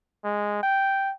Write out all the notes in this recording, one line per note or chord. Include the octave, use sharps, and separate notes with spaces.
G#3
G5